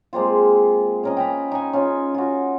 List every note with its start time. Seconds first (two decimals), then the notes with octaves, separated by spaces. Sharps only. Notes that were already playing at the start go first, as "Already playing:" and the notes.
0.13 G#3 A#3 C4 F4
1.03 C#4 A#4 D#5
1.17 G5 A#5 B5
1.52 D#4 G#5
1.73 C#4 F4
2.14 F4 F#4